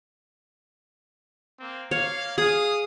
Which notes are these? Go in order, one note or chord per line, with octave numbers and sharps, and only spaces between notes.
A#3 C4
A#3 C#5 F5
G#4 F5 D#6